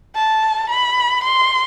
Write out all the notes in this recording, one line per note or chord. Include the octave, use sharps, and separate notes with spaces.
A5
B5
C6